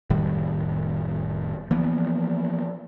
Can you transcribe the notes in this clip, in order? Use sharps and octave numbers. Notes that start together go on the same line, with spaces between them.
F1 A2 D#3 G3
E3 F3 A#3 B3